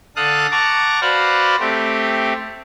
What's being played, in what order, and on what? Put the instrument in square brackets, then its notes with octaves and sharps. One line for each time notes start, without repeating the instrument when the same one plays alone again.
[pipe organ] D3 A4 F5 A5 D#6 F#6
F#5 A5 A#5 C#6 D6
F#4 B4 C5 D5 F5 F#5
A3 C4 G4